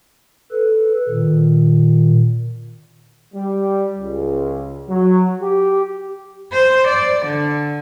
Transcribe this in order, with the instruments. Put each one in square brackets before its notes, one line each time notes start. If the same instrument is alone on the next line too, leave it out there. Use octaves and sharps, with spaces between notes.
[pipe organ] A4 B4
A#2 D#3
[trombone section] G3
C#2
F#3
G4
[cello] C5
D5
D3